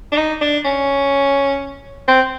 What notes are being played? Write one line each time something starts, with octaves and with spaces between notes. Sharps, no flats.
D4
D#4
D4
C#4
C4